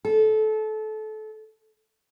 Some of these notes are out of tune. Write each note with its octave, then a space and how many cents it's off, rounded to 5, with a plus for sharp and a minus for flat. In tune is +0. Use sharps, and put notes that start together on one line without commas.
A4 -25